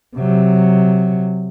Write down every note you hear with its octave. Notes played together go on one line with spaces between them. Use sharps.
C3 F#3